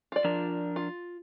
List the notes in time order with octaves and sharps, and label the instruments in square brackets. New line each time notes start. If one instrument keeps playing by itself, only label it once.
[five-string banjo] F4 D5
[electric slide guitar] F3 D4 A#4
[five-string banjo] F4